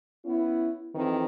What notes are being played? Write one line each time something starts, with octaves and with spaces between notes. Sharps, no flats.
B3 C#4 E4
F2 D#3 E3 C4